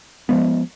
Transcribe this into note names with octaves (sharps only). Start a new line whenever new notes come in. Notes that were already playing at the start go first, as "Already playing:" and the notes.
F3 G#3 B3